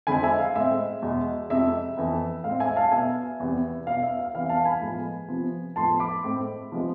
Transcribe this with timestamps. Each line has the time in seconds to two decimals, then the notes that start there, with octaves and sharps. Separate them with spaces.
0.07 F2 D3 G#3 C4 G#5 B5
0.23 E5 G#5
0.39 F5
0.55 A2 G#3 C4 E5
1.02 E2 B2 G#3
1.49 F2 C3 G#3 E5
1.97 F2 E3 B3
2.44 A2 G#3 C4 F5
2.60 E5 G#5
2.76 F5 A5
2.91 B2 B3 E5 G#5
3.40 E2 C3 E3 B3
3.87 B2 B3 F5
4.03 E5
4.19 F5
4.35 C3 E3 B3 F5
4.49 F5 A5
4.65 G#5 B5
4.81 A2 F3 G#3 B3
5.28 C3 F3 B3
5.76 A2 F3 B3 A5 C6
6.00 B5 D6
6.24 A2 G#3 C4
6.72 C3 F3 G#3 B3